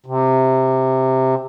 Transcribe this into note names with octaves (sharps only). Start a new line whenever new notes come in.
C3